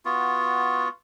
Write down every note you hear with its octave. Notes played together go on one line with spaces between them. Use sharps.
B3 F4 F#4